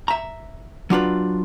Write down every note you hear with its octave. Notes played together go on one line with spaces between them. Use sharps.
E5 A#5
F#3 D4 F4 B4